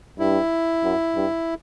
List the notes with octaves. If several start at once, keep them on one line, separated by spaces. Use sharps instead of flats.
G2 E4
F#2
G2